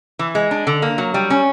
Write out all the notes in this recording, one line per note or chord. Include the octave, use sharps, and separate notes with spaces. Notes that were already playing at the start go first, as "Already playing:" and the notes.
E3
G#3
D4
D3
A#3
F#3
G3
C#4